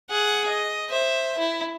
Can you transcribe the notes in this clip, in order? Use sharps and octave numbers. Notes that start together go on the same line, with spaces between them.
G#4 F#5
D#5
C5 E5
E4